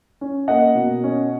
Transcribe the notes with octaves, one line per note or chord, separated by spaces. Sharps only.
C#4
A#3 D#5 F#5
B2
C#4